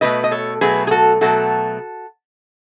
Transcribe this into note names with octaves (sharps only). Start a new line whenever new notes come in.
B2 F#3 A3 B4 D#5
D#5
A4 C#5
B2 F#3 A3 G#4 B4
G#4
F#4 A4
B2 F#3 A3 F#4 A4